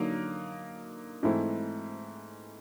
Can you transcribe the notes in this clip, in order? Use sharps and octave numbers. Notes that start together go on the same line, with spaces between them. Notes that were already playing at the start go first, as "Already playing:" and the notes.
Already playing: D3 F#3 A#3 D#4
G#2 E3 A3 C4 E4